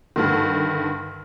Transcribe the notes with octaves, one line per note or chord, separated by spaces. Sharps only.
G2 D3 D#3